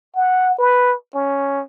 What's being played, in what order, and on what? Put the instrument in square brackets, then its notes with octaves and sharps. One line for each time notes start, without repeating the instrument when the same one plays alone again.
[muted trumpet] F#5
B4
C#4